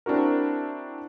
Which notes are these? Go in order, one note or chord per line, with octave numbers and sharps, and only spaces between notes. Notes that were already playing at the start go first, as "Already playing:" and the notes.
C4 D4 E4 F#4 A#4